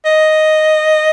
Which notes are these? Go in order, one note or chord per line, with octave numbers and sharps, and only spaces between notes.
D#5